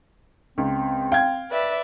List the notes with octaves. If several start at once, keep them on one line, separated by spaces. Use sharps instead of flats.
C#2 C4
F5 G5 G#6
B4 D5 E5